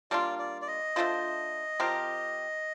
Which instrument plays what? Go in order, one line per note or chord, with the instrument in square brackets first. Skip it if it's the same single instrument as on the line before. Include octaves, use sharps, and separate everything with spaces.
[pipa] G3 A#3 D4 F4 [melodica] D5
[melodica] D5
D5
D#5
[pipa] A3 D4 F4 C5
F3 C4 G4 A#4